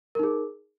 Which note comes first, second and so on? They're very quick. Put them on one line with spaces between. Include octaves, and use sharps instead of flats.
A#4 D#4 G#4